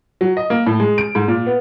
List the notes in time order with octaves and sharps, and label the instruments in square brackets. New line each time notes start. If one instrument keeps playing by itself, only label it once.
[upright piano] F#3
D#5
A#3
A2
G#3
D7
G#2
A#2
B3